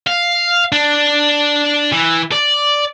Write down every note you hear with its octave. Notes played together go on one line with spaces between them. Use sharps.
F5
D4
E3
D5